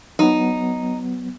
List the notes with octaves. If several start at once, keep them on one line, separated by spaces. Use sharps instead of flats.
F#3 B3 D#4